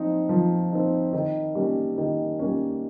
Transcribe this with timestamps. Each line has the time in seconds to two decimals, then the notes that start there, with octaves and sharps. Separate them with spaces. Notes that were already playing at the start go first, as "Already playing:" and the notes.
Already playing: F3 C4 D#4
0.29 F3
0.71 C4 D#4
1.13 D#3
1.55 G3 A#3 C#4
1.98 D#3
2.39 G3 A#3 C#4